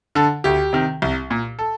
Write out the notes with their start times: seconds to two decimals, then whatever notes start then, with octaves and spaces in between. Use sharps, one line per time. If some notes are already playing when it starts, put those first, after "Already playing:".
0.15 D3 A4
0.44 D2 G4
0.73 C3 D#3
1.02 C2
1.31 A#2
1.59 A4